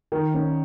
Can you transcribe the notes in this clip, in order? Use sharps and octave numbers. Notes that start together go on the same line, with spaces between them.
D#3
C#4